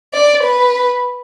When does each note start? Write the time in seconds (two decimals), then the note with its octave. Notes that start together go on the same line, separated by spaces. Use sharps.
0.14 D5
0.43 B4